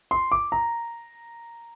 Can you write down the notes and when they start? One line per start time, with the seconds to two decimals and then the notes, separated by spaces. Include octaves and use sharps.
0.11 C6
0.32 D6
0.52 A#5